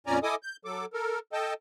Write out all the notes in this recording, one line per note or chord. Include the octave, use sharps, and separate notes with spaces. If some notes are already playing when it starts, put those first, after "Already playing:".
F2 A#2 C#4 D5 G#5 A#5
E4 A4 D#5 G#5 D6 D#6
G6
F#3 A4 D6
A4 A#4
A4 D#5 G5 A5